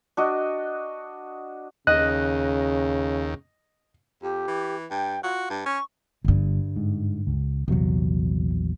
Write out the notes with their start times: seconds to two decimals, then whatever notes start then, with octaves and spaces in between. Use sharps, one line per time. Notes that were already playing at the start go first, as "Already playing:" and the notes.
0.17 D4 F#4 D#5
1.87 D#2 C#3 D#5 F#6
4.22 F2 G4
4.47 E3
4.90 G2 G5
5.23 F4 F#4
5.50 G2
5.66 C#4 C#6
6.25 G1 G2 D3
6.76 G#2
7.27 C#2
7.68 A#1 E2 C3 F#3 A#3